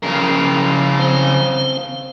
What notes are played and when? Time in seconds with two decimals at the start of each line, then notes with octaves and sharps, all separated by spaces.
0.03 C#3 F3 A#4
0.99 C4 C5 F5